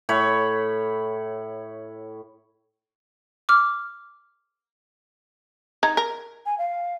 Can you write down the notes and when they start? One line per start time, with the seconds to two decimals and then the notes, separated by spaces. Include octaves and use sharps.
0.09 A2 C#5 B5
3.49 D6 F6
5.83 D#4 A#5 G#6
5.97 A#4
6.46 G#5
6.58 F5